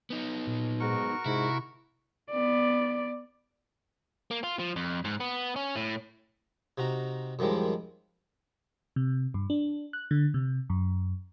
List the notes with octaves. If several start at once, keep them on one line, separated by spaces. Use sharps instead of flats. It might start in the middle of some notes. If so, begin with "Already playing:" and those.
B3 D#4
A#2
G#2 F#4 A#4 C#6
G#2 C3 E4
B3 D5
A#3
F4
F3
F2
G#2
B3
C#4
A2
C3 D#4 F#4 A#5
F#2 D#3 F3 G3 G#3
C3
G2
D4
F#6
D3
C3
F#2